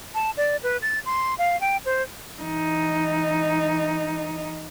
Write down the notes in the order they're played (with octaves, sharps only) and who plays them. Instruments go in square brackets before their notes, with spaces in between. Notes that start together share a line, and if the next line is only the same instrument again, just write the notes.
[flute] A5
D5
B4
A6
C6
F5
G5
C5
[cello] E3 D#4